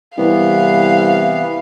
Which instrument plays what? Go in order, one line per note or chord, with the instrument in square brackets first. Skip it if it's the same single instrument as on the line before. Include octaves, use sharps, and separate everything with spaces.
[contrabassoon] C2 [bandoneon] E3 B3 [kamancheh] F5